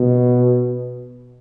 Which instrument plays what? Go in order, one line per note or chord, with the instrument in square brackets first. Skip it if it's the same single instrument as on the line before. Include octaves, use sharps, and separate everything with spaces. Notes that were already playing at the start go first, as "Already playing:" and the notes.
Already playing: [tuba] B2